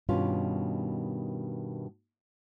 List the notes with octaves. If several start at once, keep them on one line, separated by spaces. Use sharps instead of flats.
G2 B2 D#3 C#4 F4